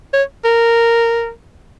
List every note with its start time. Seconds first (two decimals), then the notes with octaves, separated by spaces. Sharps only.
0.13 C#5
0.45 A#4